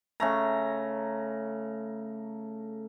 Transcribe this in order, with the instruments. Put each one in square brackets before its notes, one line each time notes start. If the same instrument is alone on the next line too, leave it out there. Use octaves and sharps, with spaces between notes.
[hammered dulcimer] C#3 A3 A#5